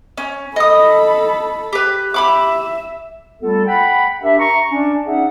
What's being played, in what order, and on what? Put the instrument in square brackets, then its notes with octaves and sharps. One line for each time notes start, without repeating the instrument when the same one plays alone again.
[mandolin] C#4
[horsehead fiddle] A4 B5 [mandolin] D#5 D#6
[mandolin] G4 B4
[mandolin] G4 B5 D6 [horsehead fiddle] E5
[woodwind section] G3 A3 B3 F4 A4
F#5 G5 B5
D4 G4 A#4 E5
A#5 C#6
C#4 D4
C#4 D#4 G#4 D5 E5 F#5